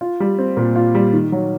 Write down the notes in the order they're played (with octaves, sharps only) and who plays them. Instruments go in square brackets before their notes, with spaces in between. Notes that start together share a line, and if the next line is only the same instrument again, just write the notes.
[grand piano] F4
G3
C4
A#2
F4
G3
D#3
F#3